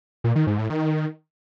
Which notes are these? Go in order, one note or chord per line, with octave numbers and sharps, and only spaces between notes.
A#2
D#3
G#2
A2
D#3